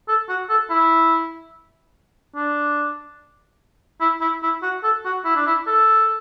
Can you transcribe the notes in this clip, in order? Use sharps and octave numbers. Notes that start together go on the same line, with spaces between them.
A4
F#4
A4
E4
D4
E4
E4
E4
F#4
A4
F#4
E4
D4
E4
A4